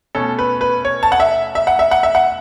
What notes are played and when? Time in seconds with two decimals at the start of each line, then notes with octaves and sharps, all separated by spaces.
0.15 B2 A3 C#4 A4
0.39 B4
0.61 B4
0.85 C#5
1.03 A5
1.12 F#5
1.20 E5
1.55 E5
1.67 F#5
1.79 E5
1.91 F#5
2.03 E5
2.15 F#5